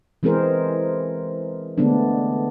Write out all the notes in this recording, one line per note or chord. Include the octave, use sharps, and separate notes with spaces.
E3 G#3 C4 G#4 A#4 C5
D3 G#3 A3 B3 D4